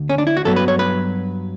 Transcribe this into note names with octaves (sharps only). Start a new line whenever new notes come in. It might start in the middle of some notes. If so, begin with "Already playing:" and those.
Already playing: D2 D3
C#4
D4
E4
F#4
G2 F#3 B3 A4
B4
C#5
B4